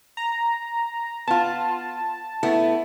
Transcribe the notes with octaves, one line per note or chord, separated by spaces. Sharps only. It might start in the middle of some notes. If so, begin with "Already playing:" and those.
A#5
B3 F4 A5
A3 B3 E4